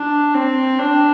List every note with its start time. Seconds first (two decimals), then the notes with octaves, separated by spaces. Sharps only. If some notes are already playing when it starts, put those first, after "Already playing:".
Already playing: D4
0.34 C4
0.79 D4